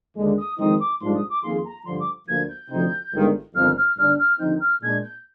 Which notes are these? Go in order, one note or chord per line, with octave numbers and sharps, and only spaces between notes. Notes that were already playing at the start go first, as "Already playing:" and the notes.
D#2 D3 G#3
D#6
F2 D#3 G#3 C4 D#4 D#6
D6
A#1 G#2 G3 D4 F4 C6
D#6
D6
F2 D#3 A#3 F4 G#4 C6
A#5
G2 D3 F3 C6
D6
D2 D3 F3 A#3 G#6
G6
D2 C3 F3 C4 D#4
G1 G2 D#3 G#3
G1 F2 D#3 F6
F6
G1 G2 D3 G3 D4 F6
F6
D#2 D3 F3 C4 D#4 G6
F6
A#2 G#3 D4 G#6
G6